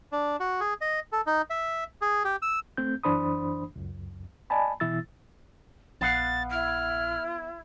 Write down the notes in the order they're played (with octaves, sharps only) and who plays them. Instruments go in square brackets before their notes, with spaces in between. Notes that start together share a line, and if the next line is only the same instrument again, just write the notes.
[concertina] D4
F#4
G#4
D#5
A4
D#4
E5
G#4
G4
E6
[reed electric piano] A3 C4 G6
F#2 E3 D4 C5 B5 D#6
C#2 F#2
D5 D#5 G#5 A5 B5
B2 E3 E4 E6 A6
[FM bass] A#1 [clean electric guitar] B3 F5 F#5 [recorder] A6
[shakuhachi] E4 [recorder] F6